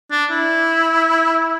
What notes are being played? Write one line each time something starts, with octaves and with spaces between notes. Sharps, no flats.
D4
E4